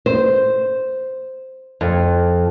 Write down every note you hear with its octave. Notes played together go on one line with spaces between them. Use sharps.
C5
F2